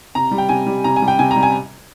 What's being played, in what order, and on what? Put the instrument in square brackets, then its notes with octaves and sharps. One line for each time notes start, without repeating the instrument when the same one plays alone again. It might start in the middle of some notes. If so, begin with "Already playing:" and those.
[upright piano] C3 A#5
G3
G5
C3 G#5
G3
C3 A#5
G#5
G3
G5
C3 G#5
A#5
G3
G#5